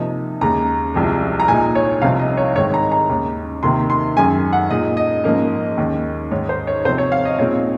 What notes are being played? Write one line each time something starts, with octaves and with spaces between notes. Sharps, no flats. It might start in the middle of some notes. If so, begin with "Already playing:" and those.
Already playing: C3 F3 A#3 D#4
D#2 C#3 G#3 C#4 A#5
C2 C3 F3 G#3
A#5
A#2 G#3 D#4 G#5
C#5
C2 C3 F3 C4 D#4 F5
D#5
C#5
G#2 D#3 G#3 C4 C#5
A#5
A#5
D#2 C#3 G#3 C#4
C3 D#3 A#3 C6
C6
F#2 D#3 G#3 C#4 G#5
F#5
A#2 G#3 D#4 D#5
D#5
G#2 F3 A#3 C#4
D#2 D#3 G#3 C#4
G#2 D#3 G#3 C#5
C5
C#5
C3 F3 C4 C5
C#5
F5
D#5
A#2 G#3 C4 D#4 C#5